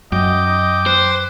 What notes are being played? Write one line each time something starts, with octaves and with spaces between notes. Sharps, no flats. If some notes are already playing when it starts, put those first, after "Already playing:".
F#2 D#5 G5 D6
D#5
B4 C5